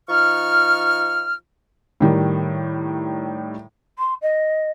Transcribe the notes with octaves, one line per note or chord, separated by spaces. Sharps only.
F3 D#4 C#6 F6
A2 D#3 G3
C6
D#5